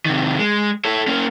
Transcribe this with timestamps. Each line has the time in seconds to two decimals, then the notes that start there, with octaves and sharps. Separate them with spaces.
0.06 C3 D#3
0.39 G#3
0.85 A4 C#5
1.08 A#3 C#4